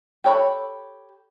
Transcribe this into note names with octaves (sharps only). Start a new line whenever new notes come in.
G4 A4 C#5 A#5 B5